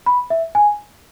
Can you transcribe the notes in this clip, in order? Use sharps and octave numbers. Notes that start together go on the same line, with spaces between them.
B5
E5
G#5